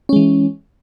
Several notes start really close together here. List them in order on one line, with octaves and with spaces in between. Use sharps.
C#4 G#3 E3